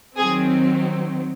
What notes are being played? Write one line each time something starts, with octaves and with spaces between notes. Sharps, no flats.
D#3 F#3 C4 G#4